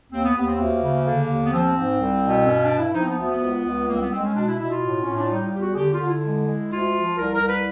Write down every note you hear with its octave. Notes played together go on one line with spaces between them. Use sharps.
D#2 C4
B3
D#2 B3
C4
B3
D2 A#3
C#3
D3
D#2
B3
F3 C4
G#2
C2
B2
G2 C#4
D4
G2
E4
F3 D#4
C4
B3
D2 B3
B3
C#2
C#2
C2 A#3
C4
B3
G#3 C4
C#4
B2 D4
E4
B2 E4
F4
A2
A2 C#4
D4
G3 D#4
F4
E2 G4
F#4
G#4
D3 G4
F4
D3
E4
G#3
G#3
D2 F4
F3
C2 A#4
A#4
C2
B4